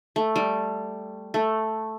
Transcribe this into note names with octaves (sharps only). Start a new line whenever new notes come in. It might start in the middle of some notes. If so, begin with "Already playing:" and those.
A3
G3
A3